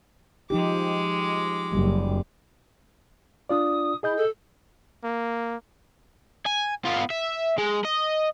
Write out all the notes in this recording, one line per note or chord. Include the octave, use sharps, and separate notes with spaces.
F3 G#3 D#4 G4 D6
F#1 G3
D4 F4 D5 D#6
E4 G#4 D#5 G6
A4
A#3
G#5
B3 F4
E5
G#3
D#5